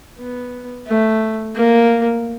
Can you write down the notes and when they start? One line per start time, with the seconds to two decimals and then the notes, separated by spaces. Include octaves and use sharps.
0.18 B3
0.87 A3
1.55 A#3